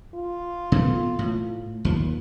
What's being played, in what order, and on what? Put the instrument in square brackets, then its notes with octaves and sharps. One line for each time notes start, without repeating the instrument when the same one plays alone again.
[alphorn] F4
[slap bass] B2 E3 A3
A2
D#2 F3